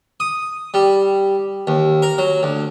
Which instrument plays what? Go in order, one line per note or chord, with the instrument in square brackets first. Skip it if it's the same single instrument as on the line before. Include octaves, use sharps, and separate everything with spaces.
[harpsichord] D#6
G3
D#2
A#4
F#3
D2